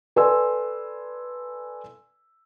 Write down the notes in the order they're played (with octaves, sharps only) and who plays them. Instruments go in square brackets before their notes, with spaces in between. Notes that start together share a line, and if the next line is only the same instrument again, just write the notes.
[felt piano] A4 B4 D5 G#5 C6 E6